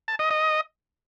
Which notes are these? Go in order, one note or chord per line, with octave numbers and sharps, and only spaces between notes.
A5
D#5
D#5